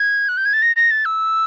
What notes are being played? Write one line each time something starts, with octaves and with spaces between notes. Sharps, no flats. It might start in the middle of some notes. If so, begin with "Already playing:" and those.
Already playing: G#6
F#6
G6
G#6
A6
A#6
A#6
A6
E6